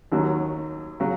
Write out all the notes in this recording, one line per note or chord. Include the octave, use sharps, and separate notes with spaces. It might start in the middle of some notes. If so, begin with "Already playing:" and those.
D#2 D#3 F#3
C#3 F#3